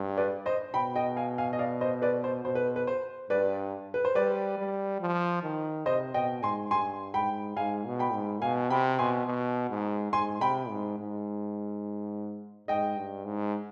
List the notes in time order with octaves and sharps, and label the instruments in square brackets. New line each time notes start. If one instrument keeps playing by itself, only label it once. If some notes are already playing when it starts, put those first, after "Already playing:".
Already playing: [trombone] G2
[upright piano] B4 D5
C5 D#5
[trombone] B2 [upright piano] G5 B5
[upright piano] D#5 G5
F5 G#5
F5 G#5
D#5
D5 F5
C5 D#5
B4 D5
C5
[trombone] B2 [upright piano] C5
[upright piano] B4
B4
C5
[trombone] G2 [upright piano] B4 D5
[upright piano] B4
C5
[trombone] G3 [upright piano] B4 D5
[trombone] G3
F3
D#3
[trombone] C3 [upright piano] C5 D#5
[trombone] B2 [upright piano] D#5 G5
[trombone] G#2 [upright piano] G#5 C6
[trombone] G2 [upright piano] G#5 C6
[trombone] G#2 [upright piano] G5 B5
[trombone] G#2 [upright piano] F5 G#5
[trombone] B2
[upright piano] G5 B5
[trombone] G#2
[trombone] B2 [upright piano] F5 G#5
[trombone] C3 [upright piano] G5 B5
[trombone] B2 [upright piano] G#5 C6
[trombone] B2
G#2
[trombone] G#2 [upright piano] G#5 C6
[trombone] C3 [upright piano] G5 B5
[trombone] G#2
G#2
[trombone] G#2 [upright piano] D#5 G5
[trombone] G2
G#2